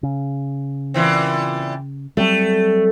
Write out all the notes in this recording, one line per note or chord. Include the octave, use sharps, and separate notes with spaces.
C#3
A#2 E3 C4
F#3 G3 A3 C4